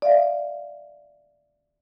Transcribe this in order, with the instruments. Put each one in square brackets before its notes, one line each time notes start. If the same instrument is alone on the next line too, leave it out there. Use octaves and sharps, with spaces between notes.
[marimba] D5 E5 F5